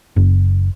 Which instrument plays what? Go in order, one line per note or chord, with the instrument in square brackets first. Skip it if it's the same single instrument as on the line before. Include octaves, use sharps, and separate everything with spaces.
[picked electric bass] F#1